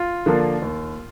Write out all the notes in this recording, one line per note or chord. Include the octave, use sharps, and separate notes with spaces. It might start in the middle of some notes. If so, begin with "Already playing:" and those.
Already playing: F4
D3 F3 A#3 D4
D#2